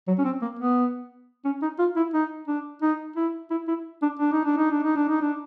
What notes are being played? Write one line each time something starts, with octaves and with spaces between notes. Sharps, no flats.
F#3
C#4
C4
A#3
B3
C#4
D#4
F4
E4
D#4
D4
D#4
E4
E4
E4
D4
D4
D#4
D4
D#4
D4
D#4
D4
D#4
D4